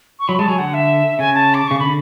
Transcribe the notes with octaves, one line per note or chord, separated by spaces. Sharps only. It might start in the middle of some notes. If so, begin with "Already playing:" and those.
C#6
F#3 B5
G#3 A5
F#3 G#5
D3 F#5
E5
C#3 G#5
A5
D6
C#3 C#6
D3 B5